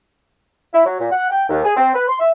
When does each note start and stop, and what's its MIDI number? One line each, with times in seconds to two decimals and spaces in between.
0.73 0.82 64
0.85 0.99 54
1.00 1.10 46
1.12 1.29 78
1.30 1.44 79
1.49 1.63 39
1.64 1.72 68
1.77 1.90 60
1.94 2.07 71
2.08 2.15 84
2.20 2.31 76